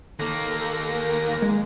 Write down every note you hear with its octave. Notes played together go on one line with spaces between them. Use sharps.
D#2 A#3 A4 A#6
A#4
G#3